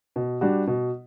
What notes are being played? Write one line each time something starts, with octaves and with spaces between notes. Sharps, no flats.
B2
G3 D4 F#4
B2